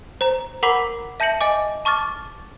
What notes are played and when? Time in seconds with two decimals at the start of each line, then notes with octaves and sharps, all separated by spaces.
0.21 C5 A#5
0.63 A#4 F#5 A#5 B5 D6 B6
1.20 E5 A5 G6 A#6 C#7 F#7
1.41 D#5 G#5 D6
1.85 A5 C#6 D6 F6 A6